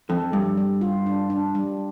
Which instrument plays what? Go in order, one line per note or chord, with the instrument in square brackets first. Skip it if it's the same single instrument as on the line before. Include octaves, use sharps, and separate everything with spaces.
[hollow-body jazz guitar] F2 [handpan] A4
[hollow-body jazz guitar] G2 [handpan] G3
[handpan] G3
F4
D4
D4
G3